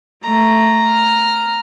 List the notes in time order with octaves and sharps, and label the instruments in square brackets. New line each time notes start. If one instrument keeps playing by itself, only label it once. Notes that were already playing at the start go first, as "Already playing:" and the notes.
[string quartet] A3 [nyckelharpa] A#5
[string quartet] F6